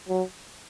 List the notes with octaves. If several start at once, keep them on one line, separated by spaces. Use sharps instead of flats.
F#3